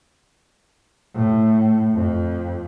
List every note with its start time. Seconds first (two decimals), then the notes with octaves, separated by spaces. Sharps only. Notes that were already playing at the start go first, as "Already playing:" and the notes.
1.14 A2
1.95 F2